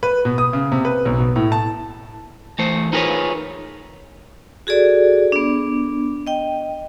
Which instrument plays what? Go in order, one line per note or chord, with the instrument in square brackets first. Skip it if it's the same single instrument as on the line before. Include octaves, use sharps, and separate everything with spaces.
[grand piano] B4
B2
D#6
C#3
C3
B4
B1
B2
A2
A5
[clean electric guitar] E3 A3 C5
D#4 F4 G#4 A#4 B4 C#5
[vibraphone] F#4 G#4 A4 D5
B3 D4
D#5 G5